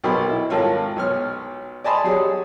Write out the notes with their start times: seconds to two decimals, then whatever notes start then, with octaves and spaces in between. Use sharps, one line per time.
0.04 B1 B2 D#4 A#4 B5
0.29 E4
0.50 G#1 F4 A4 A#4 C#5
0.96 B1 C#5 F6
1.84 D5 D#5 G#5 A5 B5 C6
2.04 F#3 G4 G#4 C#5